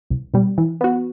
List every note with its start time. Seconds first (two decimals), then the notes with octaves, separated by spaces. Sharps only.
0.10 C2
0.34 B2 G3
0.58 E3
0.81 B3 F#4